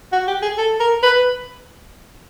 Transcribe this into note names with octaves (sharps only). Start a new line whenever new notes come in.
F#4
G4
G#4
A4
A#4
B4